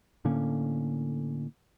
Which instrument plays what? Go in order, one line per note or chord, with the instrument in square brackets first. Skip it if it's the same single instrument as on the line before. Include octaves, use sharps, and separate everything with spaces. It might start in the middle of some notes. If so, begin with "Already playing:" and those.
[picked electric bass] A2 D3 A#3 C#4